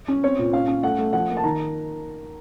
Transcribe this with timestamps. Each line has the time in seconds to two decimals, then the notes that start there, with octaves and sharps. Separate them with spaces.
0.08 C#4
0.23 C4 C#5
0.39 A#2
0.53 C#4 F5
0.68 C#4
0.83 A3 F#5
0.98 A3
1.13 F3 F#5
1.29 A#3
1.37 A5
1.44 D#3 A#5